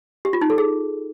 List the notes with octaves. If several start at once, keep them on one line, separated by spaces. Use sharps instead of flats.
G4
F4
D#4
A4
G#4